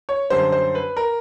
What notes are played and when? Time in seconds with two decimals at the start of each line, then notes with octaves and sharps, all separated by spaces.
0.09 C#5
0.30 F#2 D3 G3 C5
0.52 C5
0.75 B4
0.97 A#4